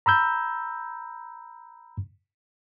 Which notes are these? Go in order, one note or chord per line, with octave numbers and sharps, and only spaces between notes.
A#5 B5 E6 G6